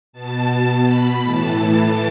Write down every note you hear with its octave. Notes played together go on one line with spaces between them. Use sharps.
B2 A5
B2
B2 B5
A2 E3 A5
A2 E3